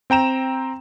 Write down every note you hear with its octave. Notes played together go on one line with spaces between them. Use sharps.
C4 G5 A#5 E7